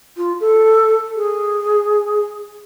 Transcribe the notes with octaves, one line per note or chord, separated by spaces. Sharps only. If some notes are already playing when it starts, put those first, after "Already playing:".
F4
A4
G#4